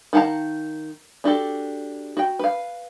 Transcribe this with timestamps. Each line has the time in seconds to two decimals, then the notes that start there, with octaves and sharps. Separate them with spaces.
0.13 D#3 F5 F#5 A5 A#5
1.24 D4 F#4 G4 A4
2.17 F#4 G5
2.39 B4 F5